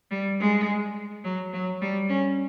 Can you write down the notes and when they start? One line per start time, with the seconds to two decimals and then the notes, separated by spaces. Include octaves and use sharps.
0.11 G3
0.40 G#3
1.24 F#3
1.53 F#3
1.81 G3
2.09 C#4